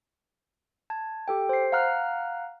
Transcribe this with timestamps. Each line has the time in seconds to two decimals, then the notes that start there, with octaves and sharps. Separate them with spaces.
0.90 A5 G#6
1.28 G4 A4 G5
1.49 C5 C7
1.72 F5 F#5 A#5 F6 F#6